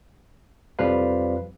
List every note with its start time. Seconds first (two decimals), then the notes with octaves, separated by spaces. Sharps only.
0.79 C2 F2 F3 G3 B4 F5